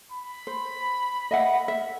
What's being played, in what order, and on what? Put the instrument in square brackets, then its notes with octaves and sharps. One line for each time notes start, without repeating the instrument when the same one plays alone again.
[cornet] B5
[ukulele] C5
D#5 E5 F#5
E5